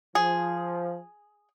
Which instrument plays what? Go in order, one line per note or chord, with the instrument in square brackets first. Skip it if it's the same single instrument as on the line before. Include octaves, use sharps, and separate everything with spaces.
[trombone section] F3 [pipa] G#4